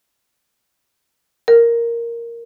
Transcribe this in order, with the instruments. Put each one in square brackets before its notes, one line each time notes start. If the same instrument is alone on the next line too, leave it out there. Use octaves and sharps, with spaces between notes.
[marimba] A#4